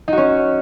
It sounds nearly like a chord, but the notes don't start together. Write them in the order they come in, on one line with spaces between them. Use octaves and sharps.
D#4 F#4 C#4